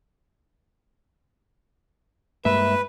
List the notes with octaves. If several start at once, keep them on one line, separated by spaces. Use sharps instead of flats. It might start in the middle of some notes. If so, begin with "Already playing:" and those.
G2 G#3 A#3 B4 E5